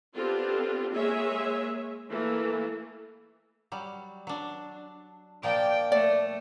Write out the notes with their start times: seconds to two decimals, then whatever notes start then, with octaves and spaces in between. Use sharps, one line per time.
0.16 B3 C4 D4 F4 G4 A4
0.92 G#3 A#3 G#4 C#5 E5
2.10 E3 A3 A#3 A4
3.72 F#3 G3
4.27 F#3 D4
5.43 A#2 F3 A#3 D5 G5
5.92 A3 D5